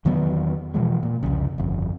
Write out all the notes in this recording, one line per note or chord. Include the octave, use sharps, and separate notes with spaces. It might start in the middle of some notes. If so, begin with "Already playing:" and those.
E2 D#3 F#3 B3
B2 E3 F3 G#3
A#2
C2 F2 C#3
G1 F2